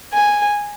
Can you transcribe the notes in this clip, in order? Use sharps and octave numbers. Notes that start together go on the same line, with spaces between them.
G#5